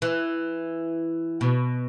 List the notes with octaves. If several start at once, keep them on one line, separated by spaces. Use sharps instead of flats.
E3
B2